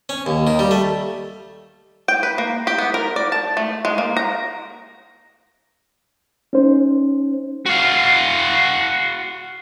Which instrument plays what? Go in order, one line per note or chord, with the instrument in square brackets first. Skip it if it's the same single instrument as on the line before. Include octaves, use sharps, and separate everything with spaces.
[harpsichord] C#4
D#2
D#3
G3
A3
[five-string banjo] G5
B4
A#3
G4
B3
A#4
D5
A5
A3
G#3
A#3
A#5
[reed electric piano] C#4 D#4 C5
[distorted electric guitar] F#4 F5